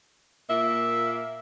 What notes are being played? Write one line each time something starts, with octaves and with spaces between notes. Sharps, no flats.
A#2 A#3 E5